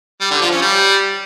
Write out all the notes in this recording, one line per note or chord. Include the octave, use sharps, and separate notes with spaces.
G3
D3
F3
C#4
G3